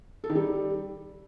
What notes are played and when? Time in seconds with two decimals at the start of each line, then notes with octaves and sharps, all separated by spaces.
0.24 A4
0.30 D#3
0.35 G3